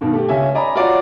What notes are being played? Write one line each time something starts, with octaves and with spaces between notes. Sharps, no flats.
G2 B2 D#3
A3 G4
C#2 C#4 E5 G#5
D5 D#5 G#5 A#5 B5
F4 F#4 C#5 D5 A#5